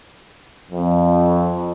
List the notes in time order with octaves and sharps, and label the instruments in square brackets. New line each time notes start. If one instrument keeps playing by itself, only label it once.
[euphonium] F2